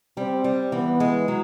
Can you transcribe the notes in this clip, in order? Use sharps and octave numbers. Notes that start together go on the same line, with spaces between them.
G3 C4
G3
E3 B3
G#3
F#3